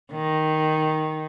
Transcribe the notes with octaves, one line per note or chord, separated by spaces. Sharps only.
D#3